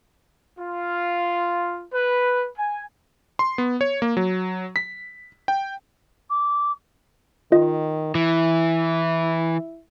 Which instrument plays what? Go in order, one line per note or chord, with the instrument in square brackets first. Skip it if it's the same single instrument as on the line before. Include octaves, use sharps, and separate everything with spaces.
[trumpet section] F4
B4
G#5
[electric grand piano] C6
B3
C#5
A#3
F#3
B6
G5
[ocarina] D6
[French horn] D#3 [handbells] F4 D#5
[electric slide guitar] E3 [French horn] E4